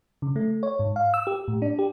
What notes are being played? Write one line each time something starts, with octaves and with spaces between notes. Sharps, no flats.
C#3
A3
C#5
G#2
F5
E6
G4
A2
D4
G4